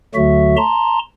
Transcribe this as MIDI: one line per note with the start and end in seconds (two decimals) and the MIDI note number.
0.15 0.56 38
0.15 0.56 50
0.15 0.56 54
0.15 0.56 57
0.15 0.56 66
0.15 0.56 76
0.57 0.99 81
0.57 0.99 82
0.57 0.99 84